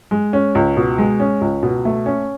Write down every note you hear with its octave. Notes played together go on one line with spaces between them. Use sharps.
G#3
C#4
C#2
B2
G#3
C#4
C#2
B2
A3
C#4